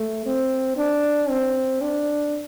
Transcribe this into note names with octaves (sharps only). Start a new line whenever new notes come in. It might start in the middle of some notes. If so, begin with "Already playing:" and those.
Already playing: A3
C4
D4
C4
D4